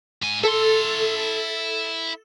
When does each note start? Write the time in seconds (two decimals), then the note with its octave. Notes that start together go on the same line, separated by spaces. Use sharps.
0.22 G#2 G#5
0.43 E4 A4 C6